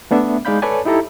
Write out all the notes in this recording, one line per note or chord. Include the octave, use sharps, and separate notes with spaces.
A3 B3 D4 E5
G#3 D#4 D5 F5 B5 G6
A4 B4 C#5 D5 G#5 A5
D#4 E4 G4 A4 A#5